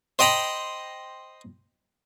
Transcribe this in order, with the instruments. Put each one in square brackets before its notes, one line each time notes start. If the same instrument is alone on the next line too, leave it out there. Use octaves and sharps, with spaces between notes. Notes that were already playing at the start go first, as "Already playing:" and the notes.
[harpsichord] C5 D#5 G5 A#5 B5